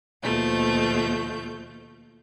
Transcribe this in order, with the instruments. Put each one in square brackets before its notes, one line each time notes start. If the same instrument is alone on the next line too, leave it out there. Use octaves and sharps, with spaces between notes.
[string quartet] D#2 B2 F3 A3 G6